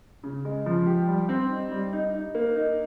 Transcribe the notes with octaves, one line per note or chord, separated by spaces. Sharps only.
C#3
G#3
F3
G4
G3
C4
D#4
G3
D#4
D#4
A#3
D#4